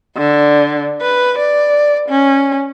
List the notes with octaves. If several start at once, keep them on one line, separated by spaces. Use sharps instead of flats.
D3
B4
D5
C#4